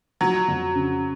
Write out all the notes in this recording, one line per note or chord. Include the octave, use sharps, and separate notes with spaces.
F3 F#3
F2
C#3